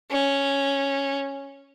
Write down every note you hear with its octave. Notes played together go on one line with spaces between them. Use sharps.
C#4